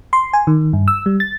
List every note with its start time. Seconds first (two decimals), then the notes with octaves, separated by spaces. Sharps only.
0.13 C6
0.33 G#5
0.47 D#3
0.73 G2
0.88 E6
1.06 G3
1.20 A6